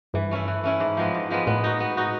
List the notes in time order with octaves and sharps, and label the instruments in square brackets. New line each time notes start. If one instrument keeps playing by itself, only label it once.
[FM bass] G2 [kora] E3
[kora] A3 C#4 E4
E3
A3 C#4 E4
G#2
F3 G#3 B3
G#2
F3 G#3 B3
[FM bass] A2 [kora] B3
[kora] D#4 F#4
B3
D#4 F#4